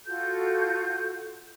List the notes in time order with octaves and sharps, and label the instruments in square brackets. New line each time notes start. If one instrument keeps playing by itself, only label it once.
[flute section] F4 F#4 A4 G6